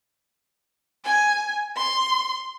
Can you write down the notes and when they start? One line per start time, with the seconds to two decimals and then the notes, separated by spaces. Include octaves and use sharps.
1.04 G#5
1.76 C6